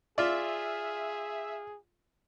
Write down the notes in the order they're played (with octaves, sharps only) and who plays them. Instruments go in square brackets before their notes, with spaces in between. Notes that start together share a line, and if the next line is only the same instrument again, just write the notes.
[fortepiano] F4 D5 [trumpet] G#4 [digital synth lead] E5